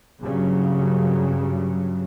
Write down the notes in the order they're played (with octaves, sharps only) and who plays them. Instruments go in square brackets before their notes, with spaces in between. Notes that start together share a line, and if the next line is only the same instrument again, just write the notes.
[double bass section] G2 C#3 F#3